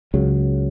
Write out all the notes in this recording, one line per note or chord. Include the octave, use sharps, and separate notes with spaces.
C#2 C#3 F#3